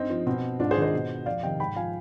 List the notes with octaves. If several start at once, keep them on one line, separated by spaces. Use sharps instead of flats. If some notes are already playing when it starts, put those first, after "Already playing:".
Already playing: G2 C4 D#4
F3
B2 C4
G#2 D4 F4
G#4 C5
D#3
C5 D#5
B2
F2 D5 F5
C3 D#3 D#5 G5
G#2 G5 B5
F3 F5 G#5